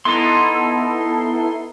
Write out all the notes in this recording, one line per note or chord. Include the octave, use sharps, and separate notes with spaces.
B3 D#4 E4 A4 C6